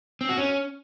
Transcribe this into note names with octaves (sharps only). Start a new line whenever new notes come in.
C4
F#4
C#4